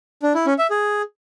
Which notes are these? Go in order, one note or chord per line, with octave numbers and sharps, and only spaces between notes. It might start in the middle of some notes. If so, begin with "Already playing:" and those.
D4
E4
C#4
E5
G#4